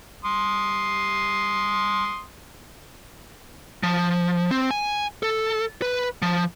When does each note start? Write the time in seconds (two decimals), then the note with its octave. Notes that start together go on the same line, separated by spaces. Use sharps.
0.25 C6 D#6
3.83 F3
4.51 C4
4.71 G#5
5.23 A4
5.82 B4
6.22 F3